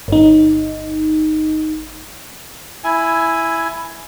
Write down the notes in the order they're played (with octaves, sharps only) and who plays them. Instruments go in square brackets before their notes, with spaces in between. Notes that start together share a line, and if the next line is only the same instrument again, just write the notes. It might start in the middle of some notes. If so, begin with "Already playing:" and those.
[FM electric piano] G1 D#4
[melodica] E4 G#5